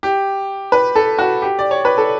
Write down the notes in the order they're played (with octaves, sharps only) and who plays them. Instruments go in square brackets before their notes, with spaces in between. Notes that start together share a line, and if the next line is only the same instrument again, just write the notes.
[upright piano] G4
B4
A4
F#4
G4
D5
C#5
B4
A4